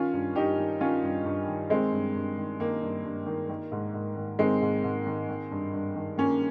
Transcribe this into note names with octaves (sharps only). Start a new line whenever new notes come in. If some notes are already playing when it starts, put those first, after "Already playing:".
Already playing: D#3 C#4 F4
G2
G2 D#4 G4
D#3
D#3 C#4 F4
G2
G2
D#3
D#3 G#3 C4
G2
G2
D#3
D#3 A#3
G2
G2
D#3
D#3
G#2
G#2
D#3
D#3 G#3 C4
G#2
G#2
D#3
D#3
G2
G2
D#3
D#3 A#3 C#4